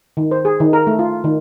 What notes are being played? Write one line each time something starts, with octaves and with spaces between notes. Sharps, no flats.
D#3
C5
G#4
D#3
A#4
A3
F4
D#3